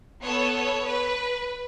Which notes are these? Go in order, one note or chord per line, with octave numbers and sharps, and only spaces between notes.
B3 A4 C#5
C#5
B4